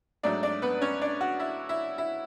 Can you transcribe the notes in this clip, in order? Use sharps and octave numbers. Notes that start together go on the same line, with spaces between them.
G#2 F#3 A3 D4 D5
D4 D5
B3 B4
C#4 C#5
D4 D5
F#4
E4
E4
E4